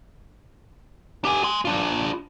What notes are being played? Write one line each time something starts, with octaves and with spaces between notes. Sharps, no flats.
G4 G#5
G#5 C6
D4 F4